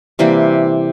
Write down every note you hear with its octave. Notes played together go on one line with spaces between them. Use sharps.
C3 E3 G3 A#3